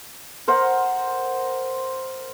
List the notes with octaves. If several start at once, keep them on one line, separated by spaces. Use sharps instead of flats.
A#4 C5 F#5